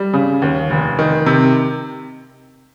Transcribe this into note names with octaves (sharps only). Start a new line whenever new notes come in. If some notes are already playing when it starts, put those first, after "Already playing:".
Already playing: G3
C#3
D#2
F1
D#3
C3